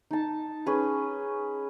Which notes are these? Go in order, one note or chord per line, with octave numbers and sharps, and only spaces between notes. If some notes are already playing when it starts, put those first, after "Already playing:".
D#4 A5
C#4 G#4 B4